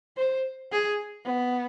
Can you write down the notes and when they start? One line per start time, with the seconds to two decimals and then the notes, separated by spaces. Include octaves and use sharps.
0.17 C5
0.72 G#4
1.25 B3